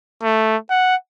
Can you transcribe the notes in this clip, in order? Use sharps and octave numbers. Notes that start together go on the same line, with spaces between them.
A3
F#5